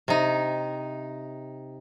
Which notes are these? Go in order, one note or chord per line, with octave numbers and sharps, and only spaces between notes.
C3 D#4